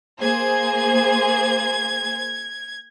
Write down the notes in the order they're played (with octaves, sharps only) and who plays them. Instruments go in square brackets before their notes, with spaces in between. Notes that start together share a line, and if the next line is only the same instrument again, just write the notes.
[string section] A#3 G#4 C5 [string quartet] G#6